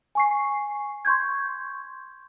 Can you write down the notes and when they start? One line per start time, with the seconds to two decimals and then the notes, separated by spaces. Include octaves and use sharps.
0.15 G#5 C#6 C7
1.05 C6 C#6 G6 G#6